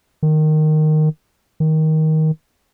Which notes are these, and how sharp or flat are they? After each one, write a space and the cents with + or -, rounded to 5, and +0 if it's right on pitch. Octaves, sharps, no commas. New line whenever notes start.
D#3 -10
D#3 +15